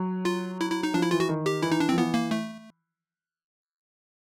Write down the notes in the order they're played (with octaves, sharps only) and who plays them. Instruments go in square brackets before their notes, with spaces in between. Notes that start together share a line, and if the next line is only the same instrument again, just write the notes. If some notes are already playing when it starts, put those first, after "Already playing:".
Already playing: [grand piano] F#3
[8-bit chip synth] F4
E4
E4
D#4
[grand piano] F3 [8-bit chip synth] D4
[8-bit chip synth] E4
[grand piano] E3 [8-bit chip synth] F4
[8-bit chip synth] F#4
[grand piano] D#3
[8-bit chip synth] G4
[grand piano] E3 [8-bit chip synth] E4
[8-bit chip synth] D#4
D4
C4
[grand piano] F3
[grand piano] E3 [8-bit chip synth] B3
[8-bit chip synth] A#3
A3